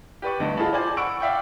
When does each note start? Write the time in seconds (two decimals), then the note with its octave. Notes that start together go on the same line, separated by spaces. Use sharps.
0.22 G4 B4 D5 C#6
0.40 D2 G2 D#4
0.57 F4 G#4 A4 D#5 A5 B5
0.73 C5 D5 G#5
0.97 F#5 B5 C#6 E6 D7
1.20 D5 E5 F5 G5 C#6